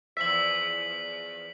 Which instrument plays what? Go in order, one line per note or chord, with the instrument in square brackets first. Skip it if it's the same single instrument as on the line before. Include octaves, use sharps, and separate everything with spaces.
[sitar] E2 F3 E5 [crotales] B6 F#7